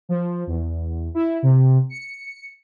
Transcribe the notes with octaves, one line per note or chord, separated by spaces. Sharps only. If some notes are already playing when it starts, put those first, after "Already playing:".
F3
E2
E4
C3
C#7